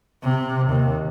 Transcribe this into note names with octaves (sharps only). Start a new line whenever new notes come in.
C3
D#2